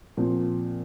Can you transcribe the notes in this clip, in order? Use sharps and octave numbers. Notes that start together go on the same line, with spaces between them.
A#2 F3 C4